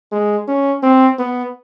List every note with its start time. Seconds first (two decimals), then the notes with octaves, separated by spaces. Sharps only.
0.12 G#3
0.48 C#4
0.83 C4
1.19 B3